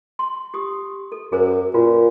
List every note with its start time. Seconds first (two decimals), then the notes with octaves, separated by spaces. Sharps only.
0.19 C6
0.54 G4 D#6
1.12 A4
1.32 F#2 G#4 A#4 C5
1.74 A#2 F4 F#4 B4